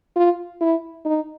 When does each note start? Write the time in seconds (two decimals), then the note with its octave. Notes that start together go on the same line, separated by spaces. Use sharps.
0.16 F4
0.61 E4
1.06 D#4